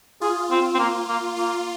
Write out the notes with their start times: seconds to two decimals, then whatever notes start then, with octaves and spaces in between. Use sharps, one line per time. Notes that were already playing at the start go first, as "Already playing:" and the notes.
0.21 F4 G#4
0.51 C4
0.74 C4
0.79 A#3
1.08 A#3
1.37 A#3 F4